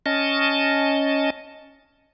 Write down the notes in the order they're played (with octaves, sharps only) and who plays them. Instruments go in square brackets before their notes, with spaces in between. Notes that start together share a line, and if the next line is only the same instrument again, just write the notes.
[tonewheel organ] C#4 D#5 A5